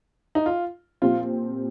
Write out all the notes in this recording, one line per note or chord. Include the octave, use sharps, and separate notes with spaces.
D#4
F4
A#2 F3 C4 F4 G4